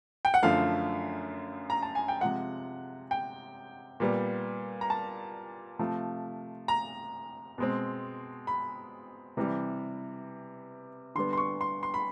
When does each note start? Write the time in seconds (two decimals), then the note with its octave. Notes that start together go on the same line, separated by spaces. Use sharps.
0.25 G5
0.34 F#5
0.43 F#2 D3 F3 A3 F5
1.70 A#5
1.83 A5
1.95 G#5
2.08 G5
2.21 C3 F3 G#3 F#5
3.11 G5
4.00 A#2 G3 B3
4.81 A#5
4.90 A5
5.79 C3 F3 A3
6.68 A#5
7.58 B2 G#3 C4
8.47 B5
9.37 C3 E3 G3
11.15 D3 G3 B3 C6
11.33 C6
11.38 C#6
11.61 C6
11.83 C6
11.94 B5